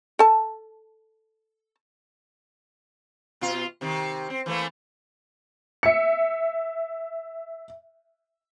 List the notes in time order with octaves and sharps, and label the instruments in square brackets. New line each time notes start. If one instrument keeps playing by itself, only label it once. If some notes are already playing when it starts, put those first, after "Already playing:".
[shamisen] A4 A5
[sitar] B2 F4
C3 D#3
C4
E3 A3 A#3
[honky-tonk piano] E5 C#7